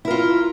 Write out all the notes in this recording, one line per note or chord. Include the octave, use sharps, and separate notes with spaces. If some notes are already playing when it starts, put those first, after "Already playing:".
E4 F4 A#4